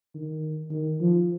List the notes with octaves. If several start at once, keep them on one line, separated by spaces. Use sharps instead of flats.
D#3
D#3
F3